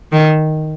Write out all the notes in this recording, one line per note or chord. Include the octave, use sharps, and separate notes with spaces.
D#3